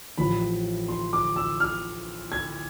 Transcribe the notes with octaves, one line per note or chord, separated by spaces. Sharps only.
A1 A2 F3 B5
C6
D6
E6
F6
G#6